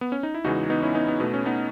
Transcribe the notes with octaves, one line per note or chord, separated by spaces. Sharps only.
B3
C#4
D#4
E4
E2 C#3 E3 G#3 D#4 F#4
B3 D#4
C#4 E4
B3 D#4
B3
B2 A3 B3
C#4
B3 D#4